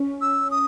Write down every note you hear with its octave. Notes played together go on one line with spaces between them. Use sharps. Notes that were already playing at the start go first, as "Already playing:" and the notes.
Already playing: C#4
E6
D#6